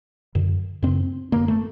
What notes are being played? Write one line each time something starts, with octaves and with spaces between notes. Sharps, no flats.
F#2 D3
F#2 C#3 C4
F#2 D3 A#3
A3